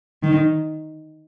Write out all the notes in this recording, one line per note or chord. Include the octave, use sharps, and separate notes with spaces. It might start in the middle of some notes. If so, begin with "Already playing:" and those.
D#3